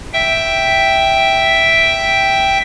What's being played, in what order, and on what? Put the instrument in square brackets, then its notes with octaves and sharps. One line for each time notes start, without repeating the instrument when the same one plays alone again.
[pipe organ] E5 G5